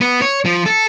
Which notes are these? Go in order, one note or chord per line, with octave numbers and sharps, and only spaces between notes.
B3
C#5
F3
A4